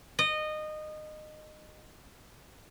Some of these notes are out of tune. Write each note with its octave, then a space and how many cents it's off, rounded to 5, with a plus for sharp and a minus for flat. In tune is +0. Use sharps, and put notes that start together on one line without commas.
D#5 -20